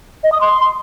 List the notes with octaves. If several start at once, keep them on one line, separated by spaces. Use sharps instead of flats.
D#5
D#6
C6